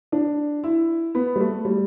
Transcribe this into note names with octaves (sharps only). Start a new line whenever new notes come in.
D4
E4
B3
G3
A3
G3